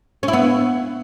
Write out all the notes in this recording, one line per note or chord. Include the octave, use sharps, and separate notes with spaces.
C#4
E4
B3